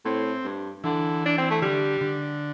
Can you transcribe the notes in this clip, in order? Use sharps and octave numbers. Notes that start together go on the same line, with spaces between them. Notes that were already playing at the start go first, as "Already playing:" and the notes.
A2 C4
G2
D3 E3
D4
C4
A3
D3 G3
D3